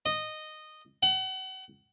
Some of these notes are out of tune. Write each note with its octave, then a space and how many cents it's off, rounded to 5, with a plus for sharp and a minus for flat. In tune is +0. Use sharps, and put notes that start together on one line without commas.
D#5 -10
F#5 +35